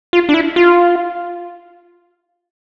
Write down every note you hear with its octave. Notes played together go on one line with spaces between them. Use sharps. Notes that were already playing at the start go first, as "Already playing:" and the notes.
F4
D4
E4
F4